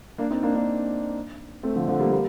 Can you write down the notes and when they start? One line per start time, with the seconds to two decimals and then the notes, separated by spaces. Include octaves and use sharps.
0.18 A#3 D4
0.30 C4 D#4
0.43 A#3 D4
0.55 A#3 D4
1.63 A3 C4
1.75 D3 F3
1.88 D3 F3
2.00 G3 A#3
2.12 G3 A#3